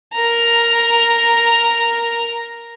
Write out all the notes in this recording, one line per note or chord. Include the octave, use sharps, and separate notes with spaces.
A#4 A#5